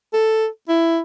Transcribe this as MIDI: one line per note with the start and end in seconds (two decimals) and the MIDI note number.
0.13 0.47 69
0.69 1.00 64